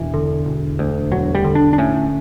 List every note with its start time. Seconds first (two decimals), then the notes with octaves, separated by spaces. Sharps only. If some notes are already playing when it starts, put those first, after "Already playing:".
Already playing: E1 E3
0.14 D3
0.46 E1
0.79 D2
1.11 E1 F#3
1.35 G3
1.44 D3
1.55 D4
1.73 D4
1.78 A2 C#4